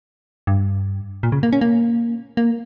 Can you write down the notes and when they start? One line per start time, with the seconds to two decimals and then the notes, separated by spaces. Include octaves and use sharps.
0.47 G2
1.23 A#2
1.32 C#3
1.43 A#3
1.53 C#4
1.61 A#3
2.37 A#3